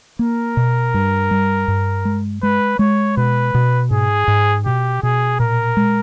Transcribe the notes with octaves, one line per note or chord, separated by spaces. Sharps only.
A#3 A#4
B2
G2
G3
G2
G#3
G#3 B4
G#3 C#5
B2 B4
B2
G#2 G#4
G#2
B2 G4
B2 G#4
A#2 A#4
G#3